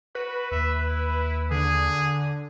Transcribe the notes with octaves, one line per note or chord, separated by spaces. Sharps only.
F#4 B4
D#2 E5
E4
D3 G#4